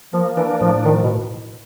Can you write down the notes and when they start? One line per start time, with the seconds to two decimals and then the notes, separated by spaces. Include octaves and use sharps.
0.13 F3 A#3
0.37 E3 D4
0.61 A2 F3
0.85 D#3 F3
1.03 B2